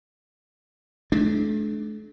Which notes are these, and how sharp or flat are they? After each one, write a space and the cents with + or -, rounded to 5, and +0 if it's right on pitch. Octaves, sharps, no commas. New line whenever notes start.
A3 -40 D4 +0